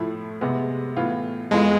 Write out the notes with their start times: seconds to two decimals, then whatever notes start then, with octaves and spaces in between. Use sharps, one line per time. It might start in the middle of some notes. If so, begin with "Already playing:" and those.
Already playing: A2 F3 A3 E4
0.41 C3 G#3 B3
0.97 A2 E3 B3 F4
1.51 F2 E3 G#3 B3 F4 A4